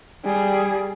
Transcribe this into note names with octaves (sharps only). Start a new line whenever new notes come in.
G3 G#4